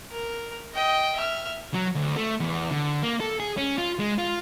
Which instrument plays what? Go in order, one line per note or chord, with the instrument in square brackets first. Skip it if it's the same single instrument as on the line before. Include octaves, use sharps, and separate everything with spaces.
[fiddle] A#4
D#5 G5
E5 F6
[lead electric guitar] F#3
D2
A3
E2
D3
A#3
A4
G#4
C#4
F4
G#3
F4